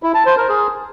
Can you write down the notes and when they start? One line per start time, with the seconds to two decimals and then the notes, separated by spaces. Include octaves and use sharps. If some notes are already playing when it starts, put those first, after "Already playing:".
0.03 E4
0.14 A5
0.26 C5
0.37 A#4
0.49 G#4